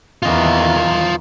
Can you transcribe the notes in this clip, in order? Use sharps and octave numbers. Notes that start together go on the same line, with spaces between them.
E2 D#3 E3 F4 D#5